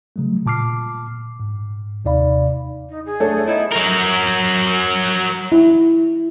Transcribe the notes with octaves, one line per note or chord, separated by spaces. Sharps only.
C#3 F#3 G3 A3
A#2 A5 D6 F6 C7
G#2
D#2 C3 D#4 D5 F5 B5
D#4
G#4
A3 D4 A4 C#5
B3 D#4 E4 C#5 B5
F#3 A#4
E4